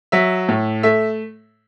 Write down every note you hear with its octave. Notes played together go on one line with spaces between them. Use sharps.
F#3 E5
A2
A3 E5